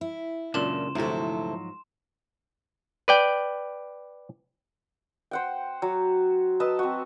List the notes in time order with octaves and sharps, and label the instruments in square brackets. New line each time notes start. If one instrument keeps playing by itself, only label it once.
[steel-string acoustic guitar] E4
[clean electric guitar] C#2 [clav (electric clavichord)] F#2 A#2 D4 [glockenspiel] C6 E7
[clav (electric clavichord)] D2 C3 [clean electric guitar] G#2 F3 F#3 [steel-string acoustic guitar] E4 A4
[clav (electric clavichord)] B4 D5 G5
[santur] C5 F#5 G5
F#3
B4 D#5 A5 E6
C4 F#4